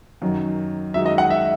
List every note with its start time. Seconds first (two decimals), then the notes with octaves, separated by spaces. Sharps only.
0.21 F#2 D#3 F#3
0.94 F#2 D#3 G#3 D#4 F#4 E5
1.06 D#5
1.18 F#5
1.30 E5